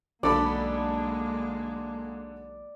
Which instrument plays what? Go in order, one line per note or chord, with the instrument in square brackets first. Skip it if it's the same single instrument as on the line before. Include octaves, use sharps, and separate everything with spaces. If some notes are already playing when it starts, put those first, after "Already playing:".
[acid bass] B1 [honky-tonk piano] D3 A4 B5 [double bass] G#3 A#3 [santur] D5